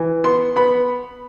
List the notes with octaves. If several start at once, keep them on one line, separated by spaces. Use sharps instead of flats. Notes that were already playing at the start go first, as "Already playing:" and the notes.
Already playing: E3
B3 C6
B3 B5